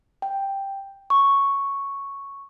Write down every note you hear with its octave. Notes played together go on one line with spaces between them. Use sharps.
G5
C#6